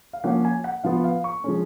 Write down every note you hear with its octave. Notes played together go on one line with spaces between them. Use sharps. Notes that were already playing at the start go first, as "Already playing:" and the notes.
F5
F3 A#3 C#4 F#5
G#5
F#5
F3 B3 F4 F5
F5
C#6
F3 G#3 C#4